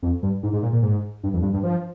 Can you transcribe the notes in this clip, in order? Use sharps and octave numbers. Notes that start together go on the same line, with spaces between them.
F2
G2
G#2
G#2
A#2
A#2
G#2
G2
F2
G2
G2
F3